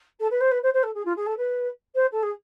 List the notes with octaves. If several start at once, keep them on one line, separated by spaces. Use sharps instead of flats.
A4
B4
C5
B4
C5
C5
A4
G#4
F4
G#4
A4
B4
C5
A4
G#4